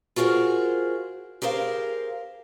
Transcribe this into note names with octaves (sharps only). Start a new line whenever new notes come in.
F4 F#4 G#4 A#4 C5 F#5
G4 G#4 A#4 C5 F5